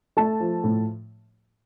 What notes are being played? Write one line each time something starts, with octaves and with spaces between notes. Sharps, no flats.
A3 A5
F3
A2